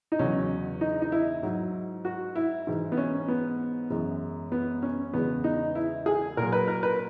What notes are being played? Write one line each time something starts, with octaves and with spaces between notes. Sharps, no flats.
D#4
E2 C#3 F#3 C#4
D#4
D#4
E4
G#2 F#3
F#4
E4
G#2 E3 G#3
B3
C#4
B3
F#2 E3 G#3
B3
C#4
E2 C#3 G#3 B3
D#4
E4
G#4
A#2 F#3 A#4
B4
A#4
B4